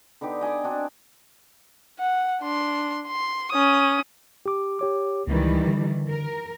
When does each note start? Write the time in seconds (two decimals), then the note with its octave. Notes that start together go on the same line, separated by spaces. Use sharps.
0.21 D3 B3 D#4 G4
0.41 D#5 G#5 B5 D6
0.64 C4 D4 F#4
1.99 F#5
2.41 D4 C6
3.07 C6
3.52 C#4 D#6
4.46 G4 D6
4.79 G4 C#5 D6
5.27 C#2 D#3 E3 G3
5.67 D3
6.09 A#4